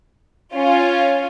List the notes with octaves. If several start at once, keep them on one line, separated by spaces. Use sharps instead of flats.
C#4 F4